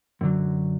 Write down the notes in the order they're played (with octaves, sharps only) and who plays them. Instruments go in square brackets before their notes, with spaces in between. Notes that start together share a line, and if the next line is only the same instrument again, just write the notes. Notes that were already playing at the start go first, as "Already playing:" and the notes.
[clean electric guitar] F#2 D3 F#3